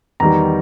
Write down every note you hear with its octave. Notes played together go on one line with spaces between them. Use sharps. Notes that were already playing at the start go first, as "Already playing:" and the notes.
E2 D#3 G3 A#5